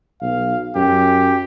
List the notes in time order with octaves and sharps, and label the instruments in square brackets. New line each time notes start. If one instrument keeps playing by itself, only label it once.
[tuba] B1 [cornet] F5
[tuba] F#2 [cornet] G4